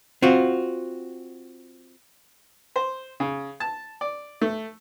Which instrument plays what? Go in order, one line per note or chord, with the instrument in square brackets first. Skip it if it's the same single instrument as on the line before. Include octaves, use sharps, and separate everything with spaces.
[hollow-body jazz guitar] C4 F4 F#4
[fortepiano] C5
C#3
A5
D5
A3